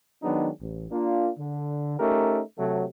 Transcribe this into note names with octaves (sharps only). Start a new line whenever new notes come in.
D#3 F#3 G#3 B3 D4 D#4
A1
A#3 D4 F4
D3
A3 C#4 D#4 G4 A#4
C3 F#3 A3